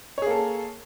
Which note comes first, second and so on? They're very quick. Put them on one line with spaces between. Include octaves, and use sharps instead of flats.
C#5 G#4 A#3 A4